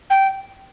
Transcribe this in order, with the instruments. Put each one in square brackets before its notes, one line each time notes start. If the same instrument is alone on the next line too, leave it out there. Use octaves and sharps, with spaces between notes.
[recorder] G5